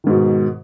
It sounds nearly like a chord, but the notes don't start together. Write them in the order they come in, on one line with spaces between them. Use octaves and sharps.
D#3 G#2 B2